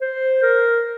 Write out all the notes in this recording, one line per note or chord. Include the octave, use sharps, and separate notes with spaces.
C5
A#4